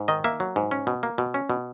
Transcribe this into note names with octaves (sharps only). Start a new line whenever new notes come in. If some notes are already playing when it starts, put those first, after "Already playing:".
Already playing: G#2
D#3 D#5
A#3 E5
F#3
G#2
C#4
B2
A#3
B2
C#4
B2